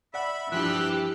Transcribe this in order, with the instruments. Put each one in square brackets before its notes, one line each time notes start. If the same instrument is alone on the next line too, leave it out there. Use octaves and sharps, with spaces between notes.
[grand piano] D5 F#5 [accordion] E5 B5
[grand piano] G2 F3 [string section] E3 G4 [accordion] E6 F#6